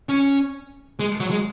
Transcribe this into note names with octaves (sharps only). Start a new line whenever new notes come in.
C#4
G#3
F#3
G#3